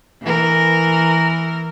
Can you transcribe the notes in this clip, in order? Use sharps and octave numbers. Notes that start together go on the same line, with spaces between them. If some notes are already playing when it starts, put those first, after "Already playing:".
E3 A#4